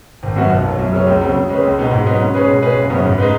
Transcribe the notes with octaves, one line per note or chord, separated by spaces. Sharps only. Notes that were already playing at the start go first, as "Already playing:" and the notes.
G#1
F#2 F#3 B3 F#4
B1
B2 F#3
F#2
C#3 F#3 C#4
C#2
C#3 F#3
C#3
G#3 C#4 B4
C#2
B2 G#3 B3 D#4
G#2
F#3 B3 D#4
C#3
G#3 C#4 G#4 B4
B2
G#3 C#4 G#4 B4
F#1
F#2 C#3 F#3 B3
G#2
G#3 D#4 B4